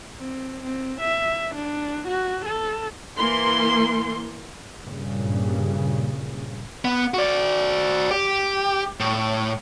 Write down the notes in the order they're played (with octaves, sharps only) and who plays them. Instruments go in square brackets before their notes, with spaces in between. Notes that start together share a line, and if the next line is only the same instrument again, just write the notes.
[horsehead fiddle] C4
C4
E5
D4
F#4
A4
[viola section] E3 A#3 C6
[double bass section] G2 A#2 C#3
[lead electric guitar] B3
F#4 D5
G4
A2